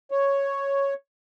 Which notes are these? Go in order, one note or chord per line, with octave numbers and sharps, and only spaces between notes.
C#5